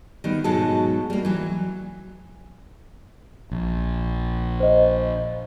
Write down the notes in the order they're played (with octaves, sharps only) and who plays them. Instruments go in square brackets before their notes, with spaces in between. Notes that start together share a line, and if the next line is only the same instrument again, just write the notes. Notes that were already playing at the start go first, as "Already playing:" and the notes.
[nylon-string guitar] D#3 G3 B3
G#2 B2 F#3 G#3 A4 A5
G3 A#3
E3 F#3
[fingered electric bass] A#1
[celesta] C5 D#5